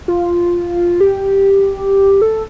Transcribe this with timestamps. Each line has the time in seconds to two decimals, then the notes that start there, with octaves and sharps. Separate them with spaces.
0.08 F4
1.00 G4
2.22 A4